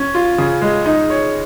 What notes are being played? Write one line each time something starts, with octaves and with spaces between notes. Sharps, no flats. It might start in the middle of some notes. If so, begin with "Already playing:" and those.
Already playing: C#4
F4
C#3
G#3
D#4
C#5